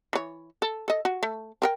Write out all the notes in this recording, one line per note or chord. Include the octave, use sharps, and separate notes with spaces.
E3 C#5
A4
A4 D#5
F#4
A3
C4 A#4 G5